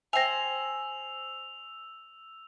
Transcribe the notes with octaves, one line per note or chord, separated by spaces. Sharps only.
C5 E5 G5 G#5 E6 A#6 F7